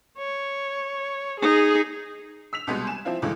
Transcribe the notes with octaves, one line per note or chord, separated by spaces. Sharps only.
C#5
D#4 G#4
E6 B6 F7
C2 B2 G3 G#3 B3 C6
G#5 E7
F3 C4 E4 F4
C#2 G2 D3 E3 G#3